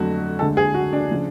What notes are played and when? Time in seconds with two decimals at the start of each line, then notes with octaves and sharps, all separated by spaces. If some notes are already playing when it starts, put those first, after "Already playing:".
Already playing: F2 D3 F#3 A3 F#4
0.39 D2 D3 G#3 A4
0.57 G#4
0.74 F#4
0.93 D4
1.11 C#3 F3